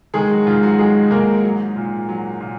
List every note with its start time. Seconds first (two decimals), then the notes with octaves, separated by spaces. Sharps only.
0.14 D#3 G#3 G#4
0.30 F#3 F#4
0.47 G#2 F4
0.63 F#3 F#4
0.78 F#3 G#3 G#4
1.11 G#2 A#3 A#4
1.44 F#3
1.76 A#2
2.09 F#3
2.41 A#2